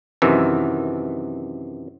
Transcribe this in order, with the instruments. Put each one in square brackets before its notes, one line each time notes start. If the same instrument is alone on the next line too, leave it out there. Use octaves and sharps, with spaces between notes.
[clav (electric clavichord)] F#2 C3 D#3 E3